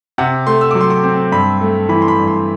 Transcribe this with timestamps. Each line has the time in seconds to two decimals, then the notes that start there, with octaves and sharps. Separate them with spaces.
0.18 C3 F#5
0.47 A3 C6
0.61 E6
0.71 F#3 D6
0.81 C6
0.90 D6
1.04 C4
1.32 G2 B5
1.61 A3
1.89 E3 B5
2.02 C6
2.08 B5
2.18 G2
2.28 C6